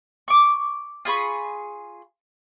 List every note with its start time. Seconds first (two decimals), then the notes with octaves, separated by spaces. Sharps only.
0.28 C#6 D6
1.05 F4 G#4 B5 C#6